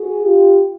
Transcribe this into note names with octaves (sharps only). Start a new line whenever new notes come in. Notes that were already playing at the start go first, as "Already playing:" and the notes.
Already playing: F#4 G#4
F4 G4